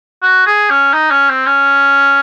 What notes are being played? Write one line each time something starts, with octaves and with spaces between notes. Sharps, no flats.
F#4
G#4
C#4
D#4
C#4
C4
C#4